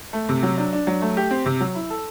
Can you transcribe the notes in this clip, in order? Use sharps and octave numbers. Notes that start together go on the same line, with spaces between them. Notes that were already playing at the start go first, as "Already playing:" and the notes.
A3
C3
F#3
D4
D4
F#3
A3
G4
C4
C3
F#3
E4
A4